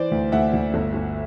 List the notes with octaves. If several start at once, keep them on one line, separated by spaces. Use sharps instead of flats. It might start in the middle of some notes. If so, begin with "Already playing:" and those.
Already playing: E3 C5 D5
D2
D2 E5 F#5
D2
G1
G1